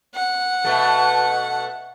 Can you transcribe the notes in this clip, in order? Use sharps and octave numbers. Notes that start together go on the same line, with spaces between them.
F#5
B2 A3